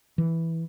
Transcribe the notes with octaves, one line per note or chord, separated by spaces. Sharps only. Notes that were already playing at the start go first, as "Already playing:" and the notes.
E3